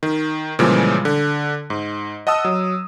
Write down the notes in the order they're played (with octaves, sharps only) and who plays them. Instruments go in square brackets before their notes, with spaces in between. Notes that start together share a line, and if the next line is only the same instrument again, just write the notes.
[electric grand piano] D#3
A#2 C#3 E3 F3 G3 G#3
D3
G#2
D#5 F#5 A5 D#6 E6
F#3